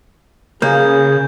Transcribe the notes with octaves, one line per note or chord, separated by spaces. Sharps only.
C#3 A#3 G#4 G6